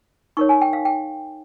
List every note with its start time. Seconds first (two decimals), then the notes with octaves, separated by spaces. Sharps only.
0.37 D#4 A#4 C#5 C#6
0.49 G#5
0.61 G5
0.73 F5
0.85 G5